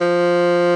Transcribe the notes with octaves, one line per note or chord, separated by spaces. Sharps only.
F3